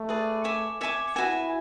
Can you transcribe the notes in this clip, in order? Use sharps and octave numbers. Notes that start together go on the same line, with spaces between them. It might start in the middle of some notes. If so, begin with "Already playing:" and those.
Already playing: A3
G#4 B4 D5
C#5 E5 G#5 D6
C#5 E5 G#5 D6
E4 F#4 B4 E5 G#5